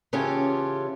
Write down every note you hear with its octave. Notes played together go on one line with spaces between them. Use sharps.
C#3 E3 C#4 F4 G4 A4